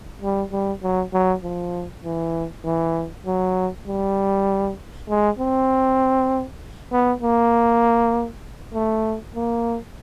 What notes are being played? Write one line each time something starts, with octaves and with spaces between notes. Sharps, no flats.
G3
G3
F#3
F#3
F3
E3
E3
F#3
G3
G#3
C4
B3
A#3
A3
A#3